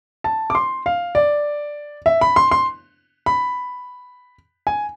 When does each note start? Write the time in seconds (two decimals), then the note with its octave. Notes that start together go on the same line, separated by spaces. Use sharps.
0.24 A5
0.50 D6
0.55 C6
0.86 F5
1.15 D5
2.06 E5
2.21 B5
2.36 C6
2.51 C6
3.26 B5
4.67 G#5